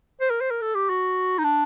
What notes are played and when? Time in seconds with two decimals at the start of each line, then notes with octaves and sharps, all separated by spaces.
0.21 C5
0.30 A#4
0.41 C5
0.51 A#4
0.62 A4
0.75 G4
0.89 F#4
1.38 D#4
1.44 D4